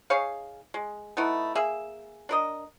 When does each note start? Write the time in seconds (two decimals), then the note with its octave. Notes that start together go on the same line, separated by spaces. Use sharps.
0.10 D#4 G#4 C#5 F5
0.74 G#3
1.17 A3 B3 D#4 E4
1.55 A#3 G#4 E5
2.29 D4 A#4 D#5